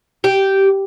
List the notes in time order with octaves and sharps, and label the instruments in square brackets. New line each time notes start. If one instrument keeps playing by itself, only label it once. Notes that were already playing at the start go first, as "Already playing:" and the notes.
[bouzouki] G4